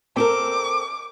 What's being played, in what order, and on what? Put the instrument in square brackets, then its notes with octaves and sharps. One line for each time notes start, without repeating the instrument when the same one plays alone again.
[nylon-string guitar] C4 A4 A#4 [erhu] D6